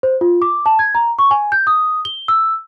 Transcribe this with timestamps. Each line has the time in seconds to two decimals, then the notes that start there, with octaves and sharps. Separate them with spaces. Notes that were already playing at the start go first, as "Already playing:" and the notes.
0.03 C5
0.21 F4
0.42 D6
0.66 A5
0.79 G#6
0.95 A#5
1.19 C#6
1.31 G#5
1.52 G6
1.67 D#6
2.05 G7
2.28 E6